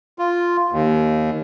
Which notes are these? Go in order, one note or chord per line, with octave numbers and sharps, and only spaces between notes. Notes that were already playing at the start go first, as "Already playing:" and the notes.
F4
D#2